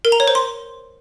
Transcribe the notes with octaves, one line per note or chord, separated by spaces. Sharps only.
A#4
A#5
C#5
C5
C6